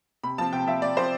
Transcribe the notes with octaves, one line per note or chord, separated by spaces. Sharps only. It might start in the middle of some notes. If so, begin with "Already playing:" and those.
C3 B5
F3 C4 A5
C3 G5
F3 C4 E5
C3 D5
F3 C4 C5